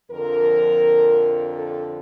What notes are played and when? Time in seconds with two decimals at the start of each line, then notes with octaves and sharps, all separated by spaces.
0.12 F2 D3 F3 A#4
1.53 A4